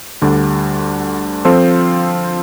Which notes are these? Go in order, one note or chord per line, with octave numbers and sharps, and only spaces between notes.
D2 D3 G3 D4
F3 C4 F4 A4 C5